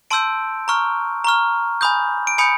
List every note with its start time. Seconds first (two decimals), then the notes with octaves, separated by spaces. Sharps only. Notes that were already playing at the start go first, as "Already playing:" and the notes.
0.10 A5 C6 E6 G6 D7
0.68 A#5 C#6 F6
1.24 A#5 C#6 F6
1.81 G#5 B5 D#6 G6
2.27 D7
2.38 G#5 B5 D#6 G6 C#7